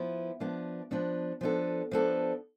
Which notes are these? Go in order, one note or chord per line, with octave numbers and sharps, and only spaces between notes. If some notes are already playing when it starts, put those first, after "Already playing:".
Already playing: F3 B3 E4
F3 B3 D4
F3 B3 D4
F3 B3 D4 A4
F3 B3 D4 A4